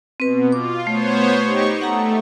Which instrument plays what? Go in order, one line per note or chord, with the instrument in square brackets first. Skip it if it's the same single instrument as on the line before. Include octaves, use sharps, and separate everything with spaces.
[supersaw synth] B2 [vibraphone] C4 B4
[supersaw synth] F4 [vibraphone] D6
[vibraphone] A3 [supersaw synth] B3 C5 C#5
[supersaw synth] D#4 G4 C#6
[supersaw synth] A3 [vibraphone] F#5 A#5 D#6